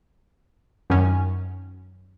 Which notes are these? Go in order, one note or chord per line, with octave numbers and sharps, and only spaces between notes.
F#2 D#3 F#3 C#4